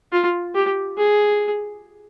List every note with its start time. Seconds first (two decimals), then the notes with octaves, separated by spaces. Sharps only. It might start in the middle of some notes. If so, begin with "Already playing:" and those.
0.12 F4
0.55 G4
0.98 G#4